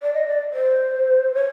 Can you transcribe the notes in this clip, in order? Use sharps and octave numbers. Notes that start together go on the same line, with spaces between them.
D5
D#5
D5
C5
C#5